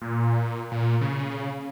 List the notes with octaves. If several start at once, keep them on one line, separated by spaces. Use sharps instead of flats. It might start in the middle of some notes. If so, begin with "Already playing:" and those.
A#2
A#2
C#3